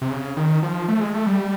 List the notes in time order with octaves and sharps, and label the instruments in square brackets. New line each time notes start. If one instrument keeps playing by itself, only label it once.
[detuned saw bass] C3
C#3
D#3
F3
A3
G#3
A3
G3